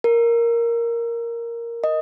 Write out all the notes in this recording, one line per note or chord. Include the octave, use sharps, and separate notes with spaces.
A#4
D#5